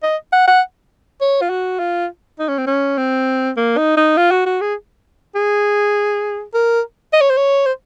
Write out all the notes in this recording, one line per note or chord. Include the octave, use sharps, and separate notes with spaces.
D#5
F#5
F#5
C#5
F4
F#4
F4
D#4
C#4
C4
C#4
C4
A#3
D#4
D#4
F4
F#4
F#4
G#4
G#4
A#4
D#5
C#5
C5
C#5
C5